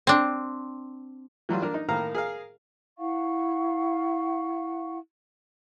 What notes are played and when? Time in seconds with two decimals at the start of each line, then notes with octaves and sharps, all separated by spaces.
0.07 C4 D4
1.49 E3 F#3 G3 F4
1.61 A#3 D4 A#4
1.74 D#4
1.88 A2 D#3 A#3 A#4 F5 A#5
2.15 G#4 A#4 F5
2.98 E4 F5 F#5 C#6